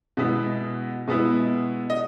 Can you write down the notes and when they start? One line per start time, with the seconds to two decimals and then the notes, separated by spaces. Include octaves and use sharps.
0.17 B2 G#3 B3 E4
1.07 B2 G#3 B3 E4
1.90 D#5